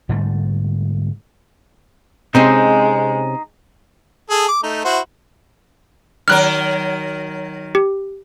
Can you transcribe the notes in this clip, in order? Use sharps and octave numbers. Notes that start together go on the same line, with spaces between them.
G#2 D3 G3 A3
C3 G#3 C4 C#4 D#4 C5
G#4 A4
D6
A3 D#4
E4 F#4 C5
D#3 F#3 A#4 F6 F#6
G4